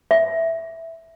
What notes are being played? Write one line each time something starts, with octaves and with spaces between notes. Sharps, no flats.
E5